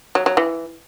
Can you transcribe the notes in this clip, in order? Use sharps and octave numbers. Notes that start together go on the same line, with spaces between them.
F#3
F#3
E3